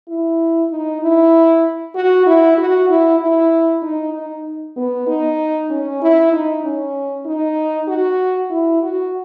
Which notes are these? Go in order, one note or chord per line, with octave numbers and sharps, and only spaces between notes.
E4
D#4
E4
F#4
E4
F#4
E4
E4
D#4
D#4
B3
D#4
C#4
E4
D#4
C#4
D#4
F#4
E4
F#4